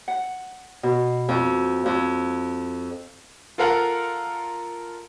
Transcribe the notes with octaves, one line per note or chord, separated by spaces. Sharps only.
F#5
B2
F2
F2
F4 A4 A#4 F5 F#5